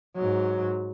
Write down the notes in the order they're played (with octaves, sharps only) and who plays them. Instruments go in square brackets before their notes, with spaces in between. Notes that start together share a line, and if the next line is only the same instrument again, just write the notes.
[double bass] G#2 F#3